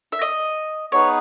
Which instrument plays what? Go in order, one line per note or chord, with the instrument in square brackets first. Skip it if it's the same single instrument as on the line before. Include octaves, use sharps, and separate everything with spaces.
[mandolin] E5
D#5
[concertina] B3 D#4 G#4 B4 [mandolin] C#5